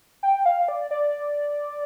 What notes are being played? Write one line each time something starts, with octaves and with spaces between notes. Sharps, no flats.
G5
F5
D5
D5